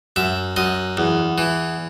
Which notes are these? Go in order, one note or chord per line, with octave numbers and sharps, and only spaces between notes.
F#2 E5
F#2 D#5
E2
E3